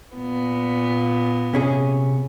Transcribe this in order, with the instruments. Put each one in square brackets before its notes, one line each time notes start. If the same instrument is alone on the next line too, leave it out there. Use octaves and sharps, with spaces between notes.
[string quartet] A#2 B3
[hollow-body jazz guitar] C3 C#4 G#4